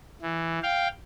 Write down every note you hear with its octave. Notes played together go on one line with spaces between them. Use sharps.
E3
F5 G5